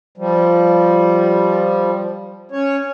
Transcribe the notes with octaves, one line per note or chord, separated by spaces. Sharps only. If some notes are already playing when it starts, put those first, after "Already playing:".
F3 G3
C#4 C#5